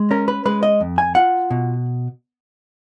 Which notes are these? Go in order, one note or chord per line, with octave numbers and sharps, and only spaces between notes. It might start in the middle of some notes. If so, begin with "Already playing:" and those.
Already playing: G#3
C#4 A#4
B4
G#3 B4
D#5
F2
G#5
F4 F#5
B2